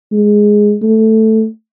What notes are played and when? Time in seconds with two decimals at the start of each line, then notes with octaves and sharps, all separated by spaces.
0.12 G#3
0.83 A3